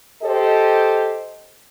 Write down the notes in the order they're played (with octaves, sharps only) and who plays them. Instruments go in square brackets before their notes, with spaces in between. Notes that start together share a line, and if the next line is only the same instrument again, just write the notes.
[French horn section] G4 A4 C5 D#5